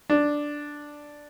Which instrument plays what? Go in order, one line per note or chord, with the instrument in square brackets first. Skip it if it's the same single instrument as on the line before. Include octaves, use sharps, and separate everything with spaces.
[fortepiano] D4